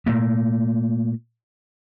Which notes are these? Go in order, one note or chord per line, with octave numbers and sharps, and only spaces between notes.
A#2 A3 A#3